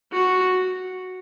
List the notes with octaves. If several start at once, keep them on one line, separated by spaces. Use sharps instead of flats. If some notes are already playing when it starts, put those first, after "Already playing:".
F#4